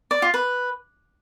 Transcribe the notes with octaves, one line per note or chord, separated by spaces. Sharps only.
D5
F4
B4